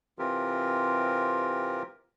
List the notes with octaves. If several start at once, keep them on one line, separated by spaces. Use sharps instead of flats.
C3 E3 C4 F4 G4 A#4